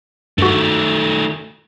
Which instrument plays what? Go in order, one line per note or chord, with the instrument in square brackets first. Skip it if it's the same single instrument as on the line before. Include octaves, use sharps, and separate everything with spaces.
[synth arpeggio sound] G2 F#4 [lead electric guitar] D#3 A3